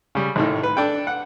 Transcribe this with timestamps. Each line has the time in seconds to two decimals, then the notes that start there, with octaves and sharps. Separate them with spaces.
0.15 C#3 G3
0.36 G#1 A2 D#3
0.63 B4
0.77 D4 A4 G5
1.07 F#5